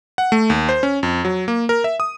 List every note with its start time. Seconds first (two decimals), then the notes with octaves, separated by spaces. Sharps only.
0.18 F#5
0.32 A3
0.50 D#2
0.69 C5
0.83 C#4
1.03 F2
1.25 F#3
1.48 A#3
1.69 A#4
1.84 E5
2.00 D#6